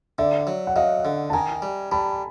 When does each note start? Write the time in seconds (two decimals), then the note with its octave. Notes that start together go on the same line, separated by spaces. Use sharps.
0.19 D3 D5 E5
0.47 F#3
0.67 F#5
0.76 F#3 D#5 F5
1.05 D3
1.30 A5
1.33 D#3 G#5 A#5
1.62 G3
1.92 G3 A5 B5